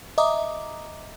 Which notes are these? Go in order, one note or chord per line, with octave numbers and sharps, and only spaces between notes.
D#5 E5 A#5 D6 D#6